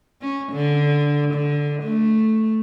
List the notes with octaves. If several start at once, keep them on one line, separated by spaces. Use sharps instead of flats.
C#4
D3
D3
A3